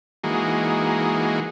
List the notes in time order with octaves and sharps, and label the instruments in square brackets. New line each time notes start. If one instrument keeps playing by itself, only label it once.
[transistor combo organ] E3 G#3 A#3 D#4 F#4 G#4